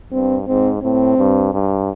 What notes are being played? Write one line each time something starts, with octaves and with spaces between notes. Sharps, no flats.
G2 C4
G#2 C4
A2 C4
G2
G2